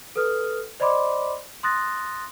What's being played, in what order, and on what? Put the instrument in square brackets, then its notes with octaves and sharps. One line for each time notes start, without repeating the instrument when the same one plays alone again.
[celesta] A4 B4 D#6 F6
C5 D5 D#5 B5 C6 D6
C6 D#6 F#6 A6 A#6